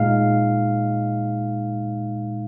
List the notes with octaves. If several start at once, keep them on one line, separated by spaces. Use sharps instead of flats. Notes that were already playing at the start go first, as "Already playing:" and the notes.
Already playing: A#2 G#3 D#4 F5